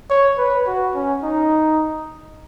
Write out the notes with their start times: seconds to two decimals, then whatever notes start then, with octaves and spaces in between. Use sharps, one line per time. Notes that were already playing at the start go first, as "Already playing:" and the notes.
0.10 C#5
0.38 B4
0.67 F#4
0.94 C#4
1.23 D#4